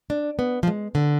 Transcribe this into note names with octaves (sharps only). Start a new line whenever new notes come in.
D4
B3
F3
G#3
D3